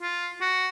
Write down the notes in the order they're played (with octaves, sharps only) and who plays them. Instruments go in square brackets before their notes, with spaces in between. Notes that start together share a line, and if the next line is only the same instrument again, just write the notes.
[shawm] F4
F#4